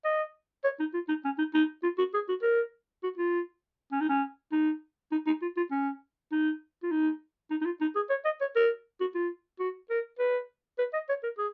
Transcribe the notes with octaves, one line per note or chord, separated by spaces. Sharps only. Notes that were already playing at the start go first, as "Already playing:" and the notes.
D#5
C#5
D#4
F4
D#4
C#4
D#4
D#4
F4
F#4
G#4
F#4
A#4
F#4
F4
C#4
D#4
C#4
D#4
D#4
D#4
F4
F4
C#4
D#4
F4
D#4
D#4
D#4
F4
D#4
G#4
C#5
D#5
C#5
A#4
F#4
F4
F#4
A#4
B4
B4
D#5
C#5
A#4
G#4